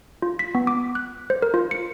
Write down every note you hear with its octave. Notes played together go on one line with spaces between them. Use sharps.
F4
B6
B3
D6
F#6
C5
A#4
F4
C#7